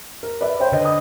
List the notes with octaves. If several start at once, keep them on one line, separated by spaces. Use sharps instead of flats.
A#4
B4 D5 E5
C5 C#5 G5
D3 B4 D#5
D#6